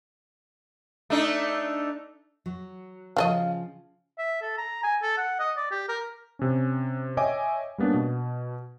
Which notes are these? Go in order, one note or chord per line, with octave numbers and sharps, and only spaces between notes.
A3 D4 D#4
F#3
C#3 F3 F#3 A4 D#5 F5
E5
A4
A#5
G#5
A4
F#5
D#5
D5
G4
A#4
C3 C#4
C#5 D#5 E5 G5 G#5 D6
G3 A#3 B3 C#4 D4
B2